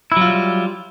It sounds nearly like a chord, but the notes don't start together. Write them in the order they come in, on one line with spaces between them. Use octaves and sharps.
E4 F#3 F4 G3